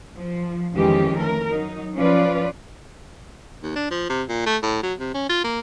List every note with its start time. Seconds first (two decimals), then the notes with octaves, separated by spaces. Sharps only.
0.17 F3
0.75 F2 D#3 E3 G#3 C#4 G4
1.17 A3 A#4
1.50 F#3 D#4
1.95 F3 C#4 F4 B4 D5
3.63 D#2
3.76 D4
3.90 F3
4.09 C3
4.29 A#2
4.46 A3
4.63 A2
4.83 F#3
5.00 C3
5.14 C#4
5.29 F4
5.44 A#3